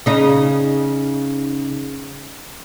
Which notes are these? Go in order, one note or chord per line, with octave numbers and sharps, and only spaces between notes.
C#3 D#4